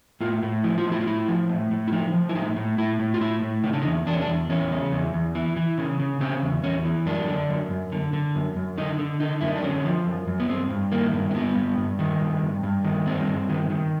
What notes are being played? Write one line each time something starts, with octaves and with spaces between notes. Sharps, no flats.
A2 F4
A2
F3 E4
F4
A2
E4
F4
A2 E4
F3
A2
A2
E4
F3 D#4
F3
E4
A2 D#4
A2
A2 E4
A2
F4
A2 E4
A2
C#3 D#4
D4
D#4
E2
E2 D4
C#4
D4
E2
E2 C#4
C#3
E2
E2
E3
E3
C#3
C#3
C#3 C4
E2
E2 C#4
E3
F#2 D4
D3
F#2
F#2
D3
D3
F#2
F#2
D3 D#4
D3
D3 D#4
F#2 E4
D#4
D4
D3 C#4
F3
F#2
F#2
B3
G2 C4
G2
D#3 A#3
G2
C4
G2 B3
G2
G2
D#3
G2
G2
G2
D#3
G2 C4
G2
D#3
D#3